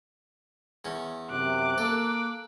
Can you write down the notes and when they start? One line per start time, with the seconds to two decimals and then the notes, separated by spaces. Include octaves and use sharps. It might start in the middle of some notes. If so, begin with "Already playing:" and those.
0.85 E2 C#4
1.31 F#2 C3 D6 F#6
1.78 A#3 A4